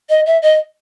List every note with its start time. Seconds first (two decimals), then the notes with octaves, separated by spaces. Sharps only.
0.09 D#5
0.26 E5
0.42 D#5